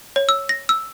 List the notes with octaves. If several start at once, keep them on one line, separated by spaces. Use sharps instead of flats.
C#5
E6
A#6
E6